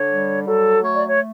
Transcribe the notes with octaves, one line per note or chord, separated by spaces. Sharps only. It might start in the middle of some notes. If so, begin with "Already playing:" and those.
Already playing: D3 C#5
G3
F#3 A4
A3 C#5
D5
C#5